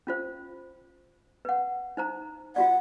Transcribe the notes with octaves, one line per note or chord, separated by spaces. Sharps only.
C#4 F4 C5
B4 F#5
D#4 C5 A#5
F4 F#4 D5 F#5